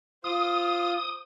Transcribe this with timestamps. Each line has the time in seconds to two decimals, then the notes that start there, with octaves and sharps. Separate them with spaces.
0.24 F4 C5 C6 D#6 F6